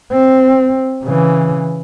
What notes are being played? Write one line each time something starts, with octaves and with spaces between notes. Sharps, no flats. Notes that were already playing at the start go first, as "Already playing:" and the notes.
C4
C#3 E3